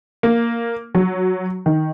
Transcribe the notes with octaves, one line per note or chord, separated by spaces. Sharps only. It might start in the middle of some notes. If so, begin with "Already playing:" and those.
A#3
F#3
D#3